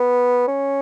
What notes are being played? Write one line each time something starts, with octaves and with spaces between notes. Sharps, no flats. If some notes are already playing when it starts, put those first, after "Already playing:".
Already playing: B3
C#4